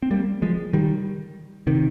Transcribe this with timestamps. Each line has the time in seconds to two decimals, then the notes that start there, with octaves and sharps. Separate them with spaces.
0.02 C4
0.11 G3 A#3
0.42 F3 G#3
0.73 D#3 G3
1.67 C3 D#3